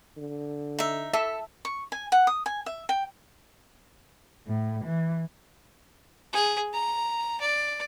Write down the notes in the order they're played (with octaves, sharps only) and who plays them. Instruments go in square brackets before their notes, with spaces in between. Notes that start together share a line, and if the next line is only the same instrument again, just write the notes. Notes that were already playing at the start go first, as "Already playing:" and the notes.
[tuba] D3
[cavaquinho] D#4 E5
[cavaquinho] A4 [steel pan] E5
[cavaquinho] C#6
G#5
F#5
D#6
G#5
E5
G5
[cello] A2
E3
[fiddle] G#4
A#5
D5